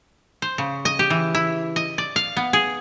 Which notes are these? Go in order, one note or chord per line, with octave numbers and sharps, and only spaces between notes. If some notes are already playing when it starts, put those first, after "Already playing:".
C5
C#3
D#5
G4
E3
E4
D#5
D5
F5
B3
G#4